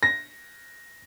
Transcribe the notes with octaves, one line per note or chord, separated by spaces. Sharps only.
A#6